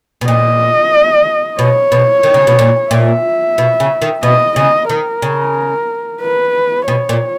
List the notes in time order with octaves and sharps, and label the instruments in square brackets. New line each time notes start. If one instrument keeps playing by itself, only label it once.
[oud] B2
[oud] A#2 [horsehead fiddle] D#5
[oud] B2 [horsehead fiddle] C#5
[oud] B2
D#3
C#3
B2
A#2
[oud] A#2 [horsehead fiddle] E5
[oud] B2
C#3
D#3
[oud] B2 [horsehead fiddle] D#5
[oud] C#3 [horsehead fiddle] D#5
[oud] D#3 [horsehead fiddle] A#4
[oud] C#3
[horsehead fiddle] B4
[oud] B2 [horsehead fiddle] C#5
[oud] A#2